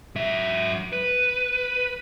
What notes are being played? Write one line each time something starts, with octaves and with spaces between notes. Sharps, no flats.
F#3 E5
B4